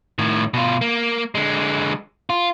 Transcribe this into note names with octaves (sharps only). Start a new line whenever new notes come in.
A2 D#3
B2 F4
A#3
D3 G#3
F4